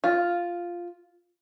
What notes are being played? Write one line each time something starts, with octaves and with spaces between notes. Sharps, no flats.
F4